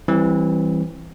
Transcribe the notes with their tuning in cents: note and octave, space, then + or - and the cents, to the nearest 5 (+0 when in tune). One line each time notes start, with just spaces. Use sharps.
E3 +0 G3 +0 C4 +25